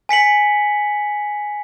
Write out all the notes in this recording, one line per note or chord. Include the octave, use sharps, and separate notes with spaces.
G#5 B6 C#7 F#7